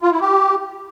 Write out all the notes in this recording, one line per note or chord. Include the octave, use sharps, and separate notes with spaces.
F4
E4
G4